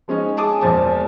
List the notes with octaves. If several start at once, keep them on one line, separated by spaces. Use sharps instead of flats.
F3 G#3 C#4 D#4
G#4 A5 D6 D#6
E1 A#2 F3 A5